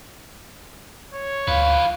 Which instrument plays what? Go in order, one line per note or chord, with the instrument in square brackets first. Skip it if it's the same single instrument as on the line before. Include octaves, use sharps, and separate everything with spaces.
[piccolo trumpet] C#5
[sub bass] D2 [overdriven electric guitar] F3 B4 [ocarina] F5